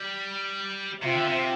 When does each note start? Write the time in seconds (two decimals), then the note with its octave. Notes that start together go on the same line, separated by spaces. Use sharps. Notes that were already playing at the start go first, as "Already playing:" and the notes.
Already playing: G3
1.02 C3 F4 C5 E5 G5
1.14 D3
1.26 C3